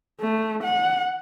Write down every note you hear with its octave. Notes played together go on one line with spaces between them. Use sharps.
A3
F#5